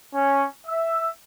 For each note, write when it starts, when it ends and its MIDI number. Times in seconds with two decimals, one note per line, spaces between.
0.14 0.45 61
0.66 1.08 76